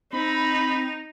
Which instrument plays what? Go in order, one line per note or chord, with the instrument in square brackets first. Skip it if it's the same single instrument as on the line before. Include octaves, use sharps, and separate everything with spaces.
[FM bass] C4 [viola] D#4 [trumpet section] B5